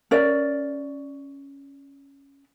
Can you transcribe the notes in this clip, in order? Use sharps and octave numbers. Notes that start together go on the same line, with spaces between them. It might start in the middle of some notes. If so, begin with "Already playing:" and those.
C#4 A#4 D5 E5